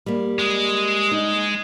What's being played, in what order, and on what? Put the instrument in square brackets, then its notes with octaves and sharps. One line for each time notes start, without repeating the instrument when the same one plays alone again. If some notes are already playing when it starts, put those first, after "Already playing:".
[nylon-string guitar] G3 A#3
[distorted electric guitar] G#3
[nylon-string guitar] D#4